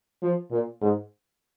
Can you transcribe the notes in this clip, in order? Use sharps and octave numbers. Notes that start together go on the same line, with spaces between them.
F3
A#2
G#2